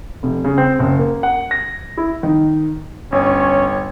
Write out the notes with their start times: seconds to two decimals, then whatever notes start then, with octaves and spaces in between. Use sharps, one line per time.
0.23 F1
0.45 C#3
0.58 C4
0.79 F#1
0.99 A#3
1.23 F#5
1.51 A#6
1.97 E4
2.23 D#3
3.12 G1 C#4 C#5